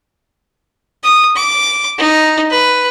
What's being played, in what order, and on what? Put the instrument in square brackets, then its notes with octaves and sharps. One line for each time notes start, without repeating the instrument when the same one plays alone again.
[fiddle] D#6
D6
D#4
B4